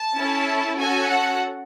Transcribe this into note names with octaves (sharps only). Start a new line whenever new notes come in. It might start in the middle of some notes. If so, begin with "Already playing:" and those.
Already playing: A5
C#4 E4 A4
C#4 F#4 A4 G#5
F#5